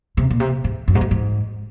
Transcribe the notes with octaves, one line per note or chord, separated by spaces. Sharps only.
C3
A#2
C3
G#2
F#2
G#2
F#2
G#2